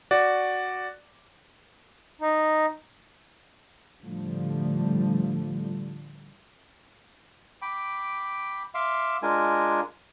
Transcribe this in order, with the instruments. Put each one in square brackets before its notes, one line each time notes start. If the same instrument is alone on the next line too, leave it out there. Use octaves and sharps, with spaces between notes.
[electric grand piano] F#4 D5
[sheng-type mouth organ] D#4
[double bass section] A2 D3 F3 G3 A3
[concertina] G5 B5 D6
E5 F5 C6 D6 E6
G#3 D4 F4 A#4 G#5